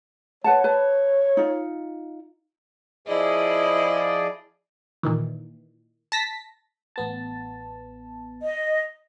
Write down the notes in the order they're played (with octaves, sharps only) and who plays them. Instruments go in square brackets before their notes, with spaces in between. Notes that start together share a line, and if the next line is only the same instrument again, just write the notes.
[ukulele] B4 F#5 A5 [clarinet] C#5
[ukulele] B4 A5
D#4 F4
[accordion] F3 G#4 D5 [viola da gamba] E4 D#5
[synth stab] A#2 D#3 E3
A5 A#6 B6
[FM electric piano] A1 B3 A5
[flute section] D#5